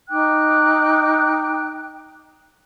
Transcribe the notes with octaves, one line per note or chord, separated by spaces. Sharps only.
D#4 G5 D6 F#6